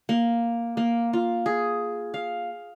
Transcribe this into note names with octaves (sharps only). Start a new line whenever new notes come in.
A#3
A#3
F4
G#4
F5